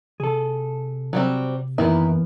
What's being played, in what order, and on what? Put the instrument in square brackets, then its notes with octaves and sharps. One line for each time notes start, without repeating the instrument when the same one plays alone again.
[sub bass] C3 [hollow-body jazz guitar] G#4 A4
[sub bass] C3 [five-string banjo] F#3 G3 C4
[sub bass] F#2 [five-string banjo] D#3 E4 [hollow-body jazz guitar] E3 A#3 B3